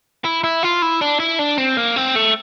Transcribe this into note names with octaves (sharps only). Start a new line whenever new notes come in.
E4
E4
F4
E4
D4
E4
D4
C4
A#3
C4
A3